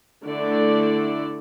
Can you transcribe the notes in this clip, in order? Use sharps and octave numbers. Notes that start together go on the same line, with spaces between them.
D3 A3 E4 A4 D5